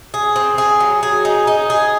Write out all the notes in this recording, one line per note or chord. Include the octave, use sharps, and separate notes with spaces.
G#4
C4
G#4
F#3
G#4
D#4
D#4
G#4